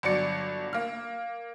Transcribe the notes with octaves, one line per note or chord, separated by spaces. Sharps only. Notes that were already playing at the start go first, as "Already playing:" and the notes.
G1 F#3 D5 C#7
A#3 F6